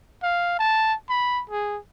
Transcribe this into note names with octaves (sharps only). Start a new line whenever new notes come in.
F5
A5
B5
G#4